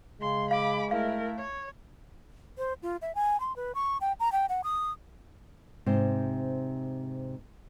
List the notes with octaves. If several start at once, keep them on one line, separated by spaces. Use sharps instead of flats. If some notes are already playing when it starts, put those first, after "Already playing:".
C#3 G#3 C6
F5 B5 D6
A3 E4 A#4 F5
C#5
C5
F4
E5
G#5
C6
B4
C#6
G5
A#5
G5
F#5
D#6
G#2 C3 C5